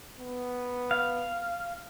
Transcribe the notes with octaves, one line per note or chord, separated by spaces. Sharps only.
B3
F5